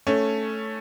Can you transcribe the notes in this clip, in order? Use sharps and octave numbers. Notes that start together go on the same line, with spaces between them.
A3 C#4